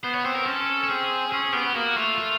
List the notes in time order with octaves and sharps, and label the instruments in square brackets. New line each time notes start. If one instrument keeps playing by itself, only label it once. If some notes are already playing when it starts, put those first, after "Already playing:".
[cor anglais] B3 [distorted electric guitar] C5
[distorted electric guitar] C#5
[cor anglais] C4 [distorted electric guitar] C5
[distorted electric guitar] A#4
[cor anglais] C#4 [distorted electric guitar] A4
[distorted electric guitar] A4
[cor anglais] C4 [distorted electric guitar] G#4
[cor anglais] C4
[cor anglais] C#4 [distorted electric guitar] G#4
[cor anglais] B3 [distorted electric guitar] G4
[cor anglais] B3
[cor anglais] A#3 [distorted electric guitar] F#4
[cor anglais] A3 [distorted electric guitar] F4
[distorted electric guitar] F4